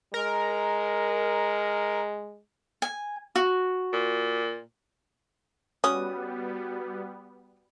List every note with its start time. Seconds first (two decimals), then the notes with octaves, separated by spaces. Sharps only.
0.14 G#3 A#4
2.82 G#5
3.36 F#4
3.93 A#2
5.84 G3 B3 C#4 F#4 D#6